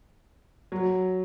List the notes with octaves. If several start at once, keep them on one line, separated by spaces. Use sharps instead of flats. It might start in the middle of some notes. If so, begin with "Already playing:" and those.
F#3